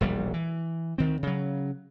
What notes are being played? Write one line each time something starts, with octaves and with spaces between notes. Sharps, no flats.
E1 A#1 G3
E3
D2 D#3 C4
C#3 F#3